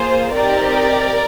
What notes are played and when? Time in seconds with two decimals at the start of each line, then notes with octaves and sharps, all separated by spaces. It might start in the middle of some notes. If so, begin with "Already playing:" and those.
Already playing: A#3 F4 G#4 C5
0.33 C4 D#4 G4 A#4 D5